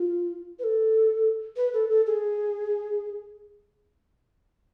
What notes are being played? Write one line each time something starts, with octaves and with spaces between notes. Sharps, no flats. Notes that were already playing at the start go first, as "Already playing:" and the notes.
Already playing: F4
B4
A4
B4
A4
A4
G#4